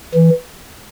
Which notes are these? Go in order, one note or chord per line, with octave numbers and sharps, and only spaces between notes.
E3